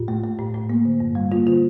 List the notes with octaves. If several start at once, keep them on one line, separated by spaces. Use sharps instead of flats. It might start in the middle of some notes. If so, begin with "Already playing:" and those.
Already playing: A2 F4
A3
A3
A2
A2
A#3
D3
G2
G3
A#3 F4
D3 F4